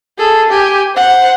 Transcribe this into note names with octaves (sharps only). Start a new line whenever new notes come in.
G#4 A4
G4 G#5
C5 F#5